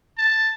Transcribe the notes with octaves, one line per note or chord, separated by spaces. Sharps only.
A5